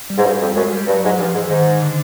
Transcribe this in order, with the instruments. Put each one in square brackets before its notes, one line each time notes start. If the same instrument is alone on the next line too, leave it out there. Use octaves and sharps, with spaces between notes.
[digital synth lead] G3
[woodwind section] G#2
G2
F2
[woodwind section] F#2 [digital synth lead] G#3
[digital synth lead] G3
[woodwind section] G2 [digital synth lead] F#3
[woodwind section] G#2
[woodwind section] G2 [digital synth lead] F3
[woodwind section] G#2 [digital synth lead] E3
[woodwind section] G#2 [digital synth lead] D#3
[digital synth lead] D3